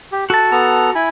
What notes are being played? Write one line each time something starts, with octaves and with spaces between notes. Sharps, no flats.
G4
F#4 A4 A5
B3 A4 A#5
E4 G#5 B5